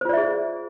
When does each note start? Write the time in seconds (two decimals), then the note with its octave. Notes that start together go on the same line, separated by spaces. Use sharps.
0.01 C5
0.05 F4
0.09 D5
0.13 E5
0.17 G#4